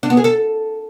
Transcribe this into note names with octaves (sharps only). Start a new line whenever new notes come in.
D4
B3
G#4
A4